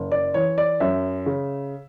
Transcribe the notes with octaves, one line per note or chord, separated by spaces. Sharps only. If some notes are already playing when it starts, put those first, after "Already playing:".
Already playing: F#1
D5
E3 C#5
D5
F#2 E5
C#3